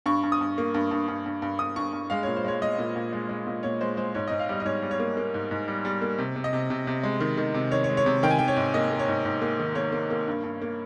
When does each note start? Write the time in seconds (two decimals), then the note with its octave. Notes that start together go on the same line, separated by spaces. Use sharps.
0.06 G2 C#6
0.23 G2
0.32 D#6
0.41 G2
0.58 A#3
0.74 G2
0.91 G2
1.08 G2
1.26 G2
1.42 G2
1.59 G2 D#6
1.76 G2 C#6
1.93 G2
2.10 G#3 F5
2.23 A#2 C#5
2.37 C5
2.44 G#3 C#5
2.61 G#3 D#5
2.79 A#2
2.96 A#2
3.13 G#3
3.29 G#3
3.47 A#2
3.63 A#2 C#5
3.81 G#3 C5
3.97 G#3 C5
4.15 G#2 C#5
4.28 G#2 D#5
4.39 F5
4.49 G3 D#5
4.60 D#5
4.65 G#2 C#5
4.82 G3
4.91 C#5
5.00 A#3
5.17 A#3
5.34 G#2
5.51 G#2
5.68 G3
5.85 G3
6.02 A#3
6.18 C3
6.36 C3
6.44 D#5
6.53 C3
6.70 C3
6.87 C3
7.04 G#3
7.20 D#3
7.37 D#3
7.54 C3
7.72 D#3 C#5
7.84 C#5
7.89 G#3
7.97 C#5
8.06 C3
8.23 D#3 G5
8.31 G#5
8.39 D#3 G5
8.48 C#5
8.57 G#2
8.74 A#3 D#5
8.91 A#3
8.99 C#5
9.08 G#2
9.25 G#2
9.42 A#3
9.59 D#3
9.75 A#3 C#5
9.92 A#3
10.10 A#3
10.27 G2
10.44 G2
10.62 A#3